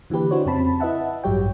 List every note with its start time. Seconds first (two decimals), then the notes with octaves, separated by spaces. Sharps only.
0.10 D3 E3 A#3 G4 B4
0.31 D4 E4 F#4 C5 C#5
0.46 F2 C#3 C4 A5 B5
0.80 E4 B4 D#5 E5 F#5 A5
1.24 A1 G2 F#3 G4 C#5 G5